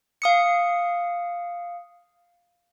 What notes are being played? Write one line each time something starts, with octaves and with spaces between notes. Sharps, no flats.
F5 D#6 C#7